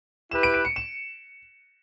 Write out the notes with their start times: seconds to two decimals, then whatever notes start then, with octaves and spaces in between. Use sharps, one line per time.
0.31 E4 G4 B4 E7
0.43 D7
0.54 D7
0.65 C#7
0.76 E7